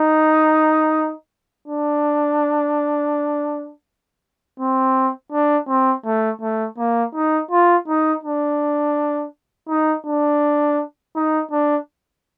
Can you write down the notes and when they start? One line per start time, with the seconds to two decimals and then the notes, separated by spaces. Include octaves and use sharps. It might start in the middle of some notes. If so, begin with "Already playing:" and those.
Already playing: D#4
1.68 D4
4.60 C4
5.32 D4
5.68 C4
6.05 A3
6.41 A3
6.78 A#3
7.15 D#4
7.51 F4
7.88 D#4
8.24 D4
9.69 D#4
10.06 D4
11.16 D#4
11.51 D4